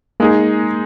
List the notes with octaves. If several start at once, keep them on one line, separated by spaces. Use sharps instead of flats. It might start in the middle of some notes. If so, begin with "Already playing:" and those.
G#3 A#3 D#4 G#4